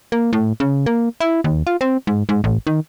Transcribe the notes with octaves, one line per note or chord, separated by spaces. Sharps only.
A#3
A2
C#3
A#3
E4
D#2
F4
C4
G#2
G#2
A1
D#3